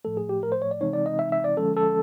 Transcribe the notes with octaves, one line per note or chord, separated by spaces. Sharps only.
A2 F3 A3 A4
G#4
G4
A#4
C5
C#5
D5
C3 E3 G#3 C4 D#4 C#5
D5
D#5
E5
E5
D5
D3 F3 G#3 C#4 A4
A4